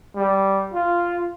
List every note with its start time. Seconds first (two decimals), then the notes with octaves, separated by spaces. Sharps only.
0.16 G3
0.74 F4